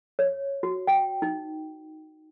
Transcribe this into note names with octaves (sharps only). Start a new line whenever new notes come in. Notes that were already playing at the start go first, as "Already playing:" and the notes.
C#5
F#4
G5
D#4